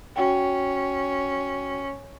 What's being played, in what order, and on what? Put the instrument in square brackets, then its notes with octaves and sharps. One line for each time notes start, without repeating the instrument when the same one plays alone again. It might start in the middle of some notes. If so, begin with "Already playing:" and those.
[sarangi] C#4 [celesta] F#4 F#5 G5